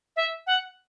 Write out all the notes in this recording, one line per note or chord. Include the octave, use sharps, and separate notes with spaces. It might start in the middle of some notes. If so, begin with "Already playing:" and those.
E5
F#5